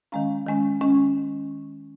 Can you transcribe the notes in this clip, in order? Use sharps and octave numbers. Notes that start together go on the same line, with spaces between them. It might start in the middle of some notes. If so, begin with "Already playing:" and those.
D#3 G#3 C#4 F5 A#5
D#3 G#3 C#4
D#3 G#3 C#4